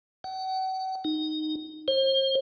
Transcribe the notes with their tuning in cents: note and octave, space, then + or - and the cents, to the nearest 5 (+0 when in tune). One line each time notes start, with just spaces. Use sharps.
F#5 +40
D#4 -5
C5 +40